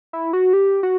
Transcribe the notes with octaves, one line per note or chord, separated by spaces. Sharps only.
E4
F#4
G4
F#4